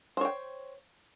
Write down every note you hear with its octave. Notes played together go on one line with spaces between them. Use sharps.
C5 C#5 G5